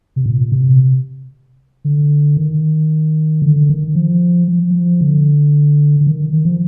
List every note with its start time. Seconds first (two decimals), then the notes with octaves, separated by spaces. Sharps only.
0.16 C3
0.26 A#2
0.52 C3
1.85 D3
2.37 D#3
3.42 D3
3.69 D#3
3.95 F3
4.48 F3
4.71 F3
5.01 D3
6.00 D3
6.07 D#3
6.33 D#3
6.45 F3